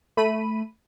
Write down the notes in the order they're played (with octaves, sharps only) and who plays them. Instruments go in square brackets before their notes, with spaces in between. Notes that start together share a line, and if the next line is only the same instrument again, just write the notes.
[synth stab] A3 B5 D#7